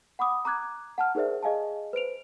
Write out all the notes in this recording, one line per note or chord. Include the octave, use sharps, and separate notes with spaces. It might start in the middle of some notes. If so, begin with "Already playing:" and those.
F#5 B5 D6 D#6
A#5 D6 F#6 G#6
F#5 A5 F6
D#4 G#4 A#4 C5 D5 E5
G#4 D#5 F5 G#5 A5
B4 C5 D7 F7